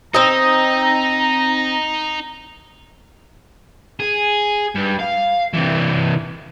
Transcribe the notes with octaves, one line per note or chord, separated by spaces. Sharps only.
C4 D#4 D#5 A#5
G#4
G2
F5
C3 E3